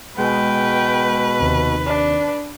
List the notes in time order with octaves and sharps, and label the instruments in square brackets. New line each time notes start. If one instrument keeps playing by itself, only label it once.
[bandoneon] B2 [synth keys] G#3 [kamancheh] B4 [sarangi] G5
[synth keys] D#2 C3
[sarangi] D4